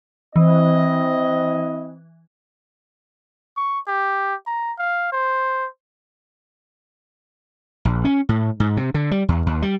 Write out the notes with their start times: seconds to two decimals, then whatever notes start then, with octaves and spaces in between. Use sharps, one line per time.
0.36 E3 C4 E4 D#5
3.57 C#6
3.88 G4
4.47 A#5
4.78 F5
5.12 C5
7.85 A#1
8.05 C#4
8.29 A2
8.60 G#2
8.77 C3
8.94 D3
9.11 G3
9.29 E2
9.46 D#2
9.62 G3